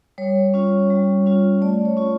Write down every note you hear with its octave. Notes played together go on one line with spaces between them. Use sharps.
G3 C#5
C#4 F4
G3
C#4 F4
A3 D5
C#5
C#4 F4